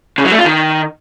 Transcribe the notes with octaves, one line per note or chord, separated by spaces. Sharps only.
C#3
F#3
A3
F4
D#3